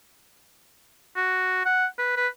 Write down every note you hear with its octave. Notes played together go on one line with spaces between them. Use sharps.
F#4
F#5
B4
B4